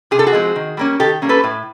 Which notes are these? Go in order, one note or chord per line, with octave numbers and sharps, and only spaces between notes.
C3 G#4
A4
F#4 G#4
F3 G#3 C4
D#3
G3 A#3 C#4
D#3 G4 A4
G3 A#3 C#4
A4 B4
A2